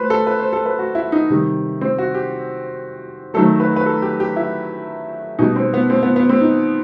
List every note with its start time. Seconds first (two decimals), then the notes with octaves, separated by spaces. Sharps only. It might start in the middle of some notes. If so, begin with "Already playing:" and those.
Already playing: A3 B4 C5
0.10 A4
0.27 B4
0.39 C5
0.53 A4
0.66 B4
0.79 F#4
0.95 E4
1.12 D#4
1.30 C3 D#3 G3
1.81 C4
1.98 F#4
2.14 G4
3.34 D#3 F#3 A3 A4
3.60 B4
3.76 B4
3.86 A4
4.02 G4
4.20 G4
4.36 E4
5.39 B2 G3 D#4
5.56 C4
5.74 B3
5.90 C4
6.03 B3
6.16 B3
6.29 C4
6.41 D#4